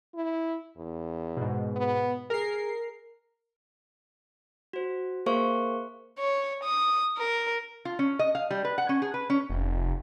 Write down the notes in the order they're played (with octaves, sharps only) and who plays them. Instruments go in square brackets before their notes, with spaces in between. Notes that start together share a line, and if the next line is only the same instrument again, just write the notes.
[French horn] E4
E2
[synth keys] G#2 B2
[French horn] B3
[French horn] G#4 [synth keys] A#4 C7
[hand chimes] F#4 C5
A#3 G#4 A#4 C5 F5 C#6
[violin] C#5
D#6
A#4
[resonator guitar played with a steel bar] F4
C#4
D#5
F5
G3
B4
F#5
C#4
G#4
B4
C#4
[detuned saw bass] F1